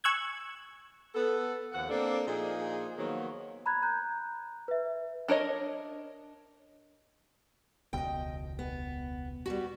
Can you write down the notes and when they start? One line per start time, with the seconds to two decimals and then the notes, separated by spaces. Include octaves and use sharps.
0.04 G#5 C#6 E6 F#6 G#6
1.14 B3 A4
1.72 D#2 F3 F#5
1.89 A#3 C4 D4 A4
2.26 A#2 F3 D#4 G#4
2.98 D#3 F3 F#3 A#3 B3
3.66 A#5 B5 F#6 G#6
3.82 A#5 F#6 G6
4.68 B4 E5
5.28 D4 A#4 C#5 D#5
7.93 E1 C#2 B2 D#5 G5
8.59 B3
9.46 G3 B3 F#4